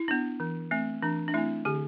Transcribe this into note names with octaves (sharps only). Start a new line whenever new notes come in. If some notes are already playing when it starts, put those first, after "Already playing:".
Already playing: E4
B3 D4
E3
A3 C4
E3 D4
D4
A3 C4 E4
D3 G4